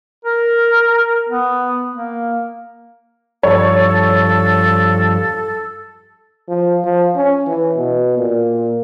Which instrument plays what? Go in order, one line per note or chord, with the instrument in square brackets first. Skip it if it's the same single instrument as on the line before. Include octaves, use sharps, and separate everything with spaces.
[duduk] A#4
B3
A#3
[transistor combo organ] G2 F3 [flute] A4 [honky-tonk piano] C#5
[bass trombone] F3
F3
C#4
E3
B2
A#2